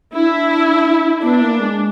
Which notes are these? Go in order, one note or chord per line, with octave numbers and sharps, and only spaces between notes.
D4 E4
B3 D4
A#3
G#3